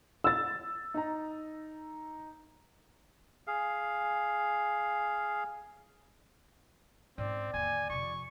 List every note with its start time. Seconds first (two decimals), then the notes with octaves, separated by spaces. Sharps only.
0.24 E6 A6
0.94 D#4 A#5
3.47 G#4 F5
7.18 G#2 C4 C#4 D5
7.54 D#2 D3 G#5
7.90 F2 C3 C#6